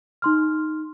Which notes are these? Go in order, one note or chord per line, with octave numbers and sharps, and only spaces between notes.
D#4 C6 F6